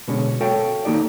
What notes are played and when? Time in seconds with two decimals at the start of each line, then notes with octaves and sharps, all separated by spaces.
0.08 B2 D3 G#3 C#4
0.41 F#4 A4 C#5 F5 G5
0.85 D#3 A#3 D#4 G4 D5